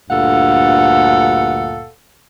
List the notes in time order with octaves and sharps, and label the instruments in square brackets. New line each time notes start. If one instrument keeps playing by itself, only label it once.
[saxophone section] D2 G2 A#2 A4 F5 F#5